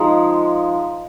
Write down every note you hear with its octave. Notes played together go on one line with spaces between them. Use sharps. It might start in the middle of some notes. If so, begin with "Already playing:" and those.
Already playing: F3 G#3 D#4